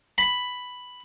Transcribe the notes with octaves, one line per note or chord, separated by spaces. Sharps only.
B5